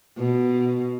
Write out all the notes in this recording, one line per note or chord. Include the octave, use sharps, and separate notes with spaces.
B2